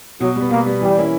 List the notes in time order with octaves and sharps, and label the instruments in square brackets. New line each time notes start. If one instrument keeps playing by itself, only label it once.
[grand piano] B2 [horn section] F#3
[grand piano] G3 B3
[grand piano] B2 [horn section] A#3
[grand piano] G3 B3
[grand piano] E3 [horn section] G3
[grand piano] A#3 C#4 E4